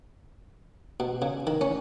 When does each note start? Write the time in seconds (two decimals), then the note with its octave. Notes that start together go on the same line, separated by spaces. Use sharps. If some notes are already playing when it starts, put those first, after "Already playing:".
1.00 B2
1.22 C#3
1.47 D#3
1.61 C#4